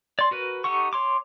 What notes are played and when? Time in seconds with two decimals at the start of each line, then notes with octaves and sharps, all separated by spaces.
0.19 D5 C6
0.31 F#4 A#4 B4
0.64 D#4 G4 A4 F#5 C#6
0.93 C#5 C6 D6